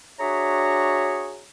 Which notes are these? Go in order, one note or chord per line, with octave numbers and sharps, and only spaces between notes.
D4 F#4 G#4 C#5 E5 A#5